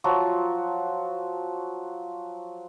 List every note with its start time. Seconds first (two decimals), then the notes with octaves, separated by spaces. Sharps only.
0.04 F3 F#3 F4 F#4